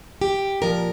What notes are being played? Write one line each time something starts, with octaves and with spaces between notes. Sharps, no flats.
G4
A#2 F3 A#4